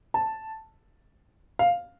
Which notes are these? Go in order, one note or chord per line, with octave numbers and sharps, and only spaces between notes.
A5
F5